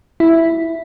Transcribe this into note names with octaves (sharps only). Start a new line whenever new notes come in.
E4